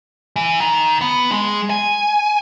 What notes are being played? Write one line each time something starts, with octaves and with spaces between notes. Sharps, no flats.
E3
D#3
B3
G#3
G#5